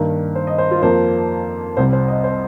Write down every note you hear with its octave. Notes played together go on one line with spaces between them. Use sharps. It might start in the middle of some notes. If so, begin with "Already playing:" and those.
Already playing: G2 D#3 A#3
C5
D#5
C5
F4
F2 F3 A#3 C5
C2 C3 G3 C5
C5
D#5
C5